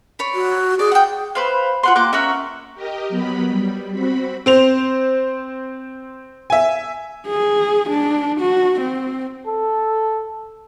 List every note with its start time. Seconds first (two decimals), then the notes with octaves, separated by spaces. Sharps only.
0.19 C#5 D5 B5
0.34 F#4
0.79 G#4 D5
0.92 F#5 G5
1.35 B4 C5 F5
1.83 F4 F#5 C6
1.95 A#3 G5 D6 F#6
2.13 C#4 A#4 E5 F#5
2.75 G4 A#4 D#5
3.09 F#3 B3 B5
3.48 G3
3.92 C4 F#4 B5
4.46 C4 C5 F7
6.50 E5 G#5
7.27 G#4
7.90 D4
8.41 F#4
8.81 C4
9.47 A4